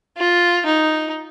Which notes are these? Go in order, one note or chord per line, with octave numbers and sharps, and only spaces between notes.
F4
D#4